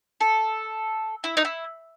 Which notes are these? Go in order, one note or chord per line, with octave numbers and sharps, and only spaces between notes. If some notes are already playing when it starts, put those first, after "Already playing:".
A4
E4
D#4
E4